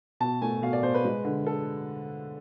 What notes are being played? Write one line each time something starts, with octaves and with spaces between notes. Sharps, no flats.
B2 A5
A3 G#5
B2 F5
D5
B2 C5
B4
G#3
D3
A4